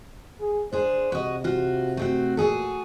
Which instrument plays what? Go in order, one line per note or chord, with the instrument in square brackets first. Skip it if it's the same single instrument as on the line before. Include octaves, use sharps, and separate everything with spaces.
[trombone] G#4
[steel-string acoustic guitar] D4 G#4 [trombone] C5
[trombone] C3 [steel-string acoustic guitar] F#4 D#5
[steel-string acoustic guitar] F4 F#4
A3 C4 F#4
[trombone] A#2 [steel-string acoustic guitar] F#4 G#4 A4